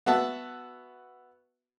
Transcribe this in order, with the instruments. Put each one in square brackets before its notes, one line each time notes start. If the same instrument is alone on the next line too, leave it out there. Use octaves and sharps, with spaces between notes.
[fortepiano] B3 F#4 E5 A5